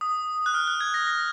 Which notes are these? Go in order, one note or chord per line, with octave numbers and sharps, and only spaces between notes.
D#6
F#6
F6
F#6
G#6
A#6
A#6